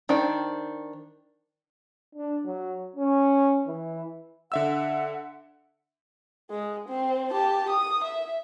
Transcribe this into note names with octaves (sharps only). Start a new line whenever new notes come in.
D#3 D4 C5 G5
D4
F#3
C#4
E3
D3 E5 F#5 E6
G#3
C4
G4 A5
D#6
E5